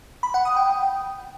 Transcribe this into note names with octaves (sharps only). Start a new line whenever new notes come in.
B5
F#5
D#6
G5